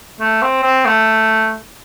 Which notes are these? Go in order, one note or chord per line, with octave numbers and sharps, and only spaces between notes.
A3
C4
C4
A3